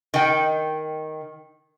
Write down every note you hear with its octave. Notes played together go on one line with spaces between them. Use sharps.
D#3 G5